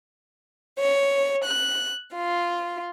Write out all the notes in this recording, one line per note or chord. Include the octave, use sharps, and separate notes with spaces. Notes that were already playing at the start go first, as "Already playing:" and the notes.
C#5
F#6
F4